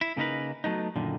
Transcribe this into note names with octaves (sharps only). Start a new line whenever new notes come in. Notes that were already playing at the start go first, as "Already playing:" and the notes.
E4
C#3 A#3 D#4 A#4 B4
F#3 A3 B3 D#4
F#2 A#2 D3 D#3